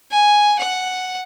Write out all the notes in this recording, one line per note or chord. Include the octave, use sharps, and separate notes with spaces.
G#5
F#5